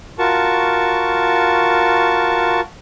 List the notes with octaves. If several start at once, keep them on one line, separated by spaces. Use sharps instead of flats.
F4 F#4 A#4 A5 C#6